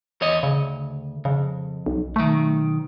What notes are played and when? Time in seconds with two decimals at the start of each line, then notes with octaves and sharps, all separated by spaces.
0.21 E2 C#5 D#5
0.43 D2 C#3
1.25 F2 C#3
1.86 B1
2.16 B1 D#3 A3